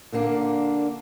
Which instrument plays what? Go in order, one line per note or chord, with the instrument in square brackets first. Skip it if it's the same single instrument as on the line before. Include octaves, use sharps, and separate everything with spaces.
[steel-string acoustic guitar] A#2 D3 A#3 D4